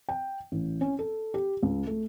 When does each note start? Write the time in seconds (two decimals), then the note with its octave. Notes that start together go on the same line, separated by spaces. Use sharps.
0.09 G5
0.52 A1
0.81 C#4
0.99 A4
1.34 G4
1.63 C#2
1.87 A3